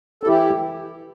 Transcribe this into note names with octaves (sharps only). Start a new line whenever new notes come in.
A4
E3 E4 G4